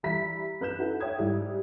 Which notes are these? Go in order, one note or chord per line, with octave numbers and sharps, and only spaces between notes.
E3 G3 E5 A#5 B5 B6
F#2 B4 F#6 G6 E7
D#4 E4 F#4 A4 B4
C#5 E5 G5 D#6 G#6
G#2 G3 E4 G4